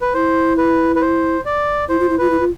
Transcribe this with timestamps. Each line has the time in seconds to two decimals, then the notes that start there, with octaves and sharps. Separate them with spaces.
0.02 B4
0.14 E4 C5
0.58 B4
0.96 B4
1.01 C5
1.45 D5
1.89 E4 C5
2.00 F4
2.09 E4
2.18 F4 B4
2.30 E4
2.40 F4